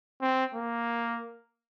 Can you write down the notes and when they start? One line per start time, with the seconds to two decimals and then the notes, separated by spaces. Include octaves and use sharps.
0.22 C4
0.55 A#3